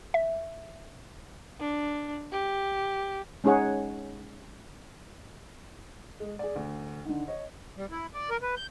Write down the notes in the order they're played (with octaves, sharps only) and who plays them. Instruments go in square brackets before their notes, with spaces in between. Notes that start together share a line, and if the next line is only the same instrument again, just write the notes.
[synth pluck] E5
[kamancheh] D4
G4
[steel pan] G#3 C#4 D#4 G#4 C#5 F#5
[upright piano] G#3
G#4 D5
D2
D3 D#3
C#5 D#5
[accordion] G3
E4
D5
A#4
B4
G6